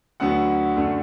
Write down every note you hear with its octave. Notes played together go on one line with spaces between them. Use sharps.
D2 D3 F#3 B3 F#4 F#5
F#2 D3 A3